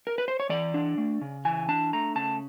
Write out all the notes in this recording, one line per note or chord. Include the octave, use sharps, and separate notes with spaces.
A#4
B4
C5
C#5
E3 D5
D4
A3
C#3
E3 G#5
D4 A5
A3 A#5
C#3 A5